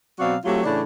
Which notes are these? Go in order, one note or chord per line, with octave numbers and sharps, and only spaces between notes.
B2 F#3 C4 F#4 D5 F5
F#3 A3 C4 F4 G4
A2 C#3 E3 D4